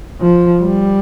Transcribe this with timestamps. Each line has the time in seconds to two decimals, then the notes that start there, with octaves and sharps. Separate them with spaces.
0.21 F3
0.62 G3